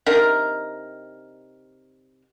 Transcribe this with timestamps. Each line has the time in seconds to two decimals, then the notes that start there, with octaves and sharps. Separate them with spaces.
0.06 C3 D4 D#4 A#4